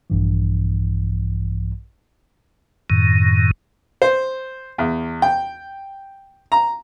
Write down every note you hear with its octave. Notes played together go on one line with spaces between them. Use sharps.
A#1 G2 E3
F#2 A2 D#3
C5
E2
G5
A#5